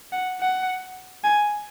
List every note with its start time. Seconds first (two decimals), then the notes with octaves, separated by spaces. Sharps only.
0.12 F#5
0.41 F#5
1.24 G#5